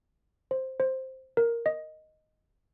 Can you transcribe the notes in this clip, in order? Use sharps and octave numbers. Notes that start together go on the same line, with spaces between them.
C5
C5
A#4
D#5